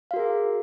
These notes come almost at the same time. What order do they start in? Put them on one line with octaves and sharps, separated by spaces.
F5 F#4 A#4 G#4